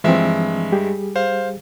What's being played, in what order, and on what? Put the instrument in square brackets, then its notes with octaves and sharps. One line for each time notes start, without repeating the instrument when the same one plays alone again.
[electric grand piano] G2 G#3 E5 [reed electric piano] E3 F3 C4
[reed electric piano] G3 G4 G#4
[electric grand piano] C5 F5